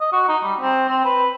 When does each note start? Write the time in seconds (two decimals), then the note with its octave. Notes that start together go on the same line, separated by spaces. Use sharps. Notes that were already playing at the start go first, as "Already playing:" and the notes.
0.01 D#5
0.12 F#4
0.28 D#4
0.44 G3
0.61 C4
0.89 C4
1.05 B4